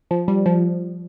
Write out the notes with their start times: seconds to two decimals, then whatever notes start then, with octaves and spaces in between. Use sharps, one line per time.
0.11 F3
0.28 G3
0.46 F3